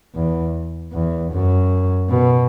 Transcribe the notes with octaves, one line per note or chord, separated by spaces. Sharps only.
E2
E2
F#2
B2